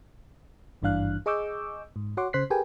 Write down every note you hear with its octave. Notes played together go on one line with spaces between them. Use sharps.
G#1 G2 E3 D4 F5 F#6
G#4 D#5 C#6 D6 E6 G6
G#2
F#4 C#5 F#5 C6 D6
C#3 C5 F#6 B6 C7
G4 G#4 A#4 B4 G5 G#5